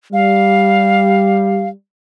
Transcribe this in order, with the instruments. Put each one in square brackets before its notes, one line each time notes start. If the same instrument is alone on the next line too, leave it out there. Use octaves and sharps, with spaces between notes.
[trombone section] G3 [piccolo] F5